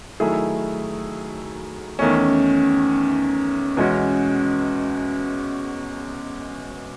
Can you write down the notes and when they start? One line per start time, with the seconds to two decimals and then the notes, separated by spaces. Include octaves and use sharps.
0.20 D#3 F#3 A3 E4 G#4
1.99 E2 D#3 A3 C#4
3.77 E2 B2 G#3 C#4 F#4